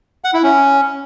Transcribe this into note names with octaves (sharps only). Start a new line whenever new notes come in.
F#5
E4
C#4